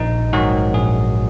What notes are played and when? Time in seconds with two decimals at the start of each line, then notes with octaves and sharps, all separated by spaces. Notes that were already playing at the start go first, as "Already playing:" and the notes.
Already playing: A#1 D#4
0.33 G#2 D#3 F#3 F#4
0.73 A#1 G#4